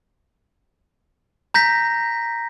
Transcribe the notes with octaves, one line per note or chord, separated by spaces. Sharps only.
A#5 G6 A#6 B6